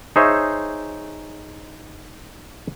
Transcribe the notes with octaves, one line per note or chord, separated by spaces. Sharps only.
D#4 G#4 C5 C#5 E5